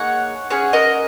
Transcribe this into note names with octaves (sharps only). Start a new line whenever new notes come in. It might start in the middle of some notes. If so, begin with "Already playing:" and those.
Already playing: A#3 D#4 G#4 C#5 F#5
C#4 G#4 C#5 F#5
A#4 D#5